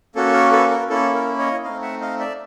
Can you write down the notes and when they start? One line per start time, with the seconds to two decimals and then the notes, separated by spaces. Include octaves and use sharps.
0.15 A#3 C#4 F#4 A4
0.34 A#4
0.52 A4 B4
0.71 A#4
0.89 A#3 C#4 E4 A4
1.15 A#4
1.39 C#5 D#5
1.63 A3 C4 D#4 D#5 F5
1.82 E5 F#5
2.01 D#5 F5
2.19 D5 E5